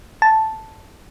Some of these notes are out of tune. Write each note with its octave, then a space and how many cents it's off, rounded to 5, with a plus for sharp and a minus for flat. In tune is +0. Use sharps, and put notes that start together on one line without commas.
A5 +0